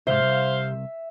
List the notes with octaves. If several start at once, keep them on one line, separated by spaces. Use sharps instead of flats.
D#2 G#2 C3 C5 E5 F5
C2